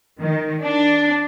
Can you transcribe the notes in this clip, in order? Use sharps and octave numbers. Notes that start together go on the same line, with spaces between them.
D#3
D4